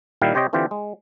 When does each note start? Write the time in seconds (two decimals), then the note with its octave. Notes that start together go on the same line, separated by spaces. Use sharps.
0.22 A#2 D#3 G3 E4 F5 G5
0.34 C3 G4 C5 C#5 D#5 G5
0.53 D3 E3 C4 F4 G4
0.71 G#3